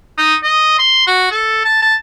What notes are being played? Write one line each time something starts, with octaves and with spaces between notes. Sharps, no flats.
D#4
D#5
C6
F#4
A4
A5
A5